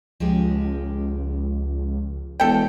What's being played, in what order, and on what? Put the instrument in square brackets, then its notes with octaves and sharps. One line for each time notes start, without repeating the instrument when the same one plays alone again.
[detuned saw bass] C#2 [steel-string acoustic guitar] F3 G#3 G4
[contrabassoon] E1 [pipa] A4 G5